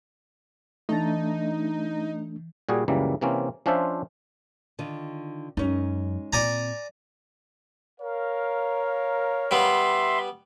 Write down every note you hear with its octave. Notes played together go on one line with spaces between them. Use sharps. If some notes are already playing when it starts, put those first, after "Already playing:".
E3 A3 D4 D#4 A5 A6
A#2 G3 F#4 G#4
C#2 F#2 C#3 E3 G3 A#3
C3 E3 A#3 C4 C#4
F3 C#4 D4 F4 C5 E5
D3 D#3 F4
F#2 G#3 C#4 D#4
A#2 C4 D5 G#5 A#5
A#4 C#5 F5
G3 B3 E5 C6